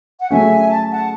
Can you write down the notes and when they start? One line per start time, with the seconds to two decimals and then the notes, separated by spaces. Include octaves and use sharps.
0.20 F#5
0.30 C#3 F#3 A3 C#4 E5 G#5
0.69 A5
0.90 F#5 A5